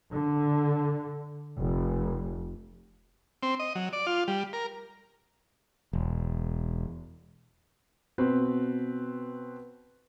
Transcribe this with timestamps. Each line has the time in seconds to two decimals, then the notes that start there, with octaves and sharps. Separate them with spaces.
0.12 D3
1.59 F1
3.43 C4
3.59 D#5
3.75 F#3
3.93 D5
4.07 F4
4.28 G3
4.53 A#4
5.93 E1
8.18 B2 C4 B4